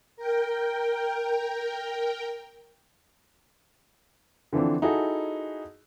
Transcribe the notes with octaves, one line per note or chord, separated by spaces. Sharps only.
A#4 G5
D3 E3 F3 C4 D4
D#4 E4 F#4 G#4 A4 D#5